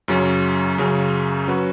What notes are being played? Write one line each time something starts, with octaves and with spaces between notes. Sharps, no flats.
F#2 C#3 F#3 C#4
F#2 C#3 F#3 C#4
F#3 C#4 F#4 B4